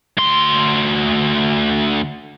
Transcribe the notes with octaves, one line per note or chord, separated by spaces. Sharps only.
D2 C6